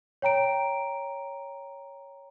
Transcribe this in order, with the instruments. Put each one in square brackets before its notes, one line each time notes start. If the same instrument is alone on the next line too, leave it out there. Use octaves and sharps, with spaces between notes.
[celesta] C#5 G5 A#5 D7